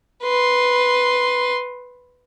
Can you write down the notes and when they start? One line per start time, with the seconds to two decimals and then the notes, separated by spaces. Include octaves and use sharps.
0.23 B4 C6